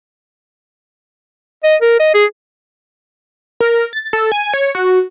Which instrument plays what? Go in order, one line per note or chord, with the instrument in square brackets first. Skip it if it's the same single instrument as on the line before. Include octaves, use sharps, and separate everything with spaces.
[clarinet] D#5
A#4
D#5
G#4
[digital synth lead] A#4
A6
A4
G#5
C#5
F#4